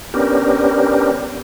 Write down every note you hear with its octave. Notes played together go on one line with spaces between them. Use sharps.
B3 C#4 D4 G4 A#4